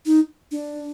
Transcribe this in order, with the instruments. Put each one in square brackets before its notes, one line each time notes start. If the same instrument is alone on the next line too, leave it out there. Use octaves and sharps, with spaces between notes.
[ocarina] D#4
D4